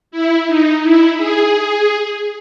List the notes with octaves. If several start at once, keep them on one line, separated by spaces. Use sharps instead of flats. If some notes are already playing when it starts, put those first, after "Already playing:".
E4
D#4
E4
G#4